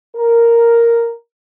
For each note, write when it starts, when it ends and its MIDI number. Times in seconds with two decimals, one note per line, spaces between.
0.15 1.12 70